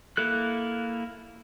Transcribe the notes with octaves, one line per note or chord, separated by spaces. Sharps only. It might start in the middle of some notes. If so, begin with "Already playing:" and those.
A#3 E4 A4 F#6